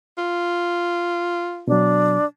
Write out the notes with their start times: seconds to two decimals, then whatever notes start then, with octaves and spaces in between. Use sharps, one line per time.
0.18 F4
1.68 B2 F#3 D4